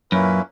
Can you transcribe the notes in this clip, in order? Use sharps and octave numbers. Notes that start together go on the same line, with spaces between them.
F#2 A#2 A#3 C#4 E4 B4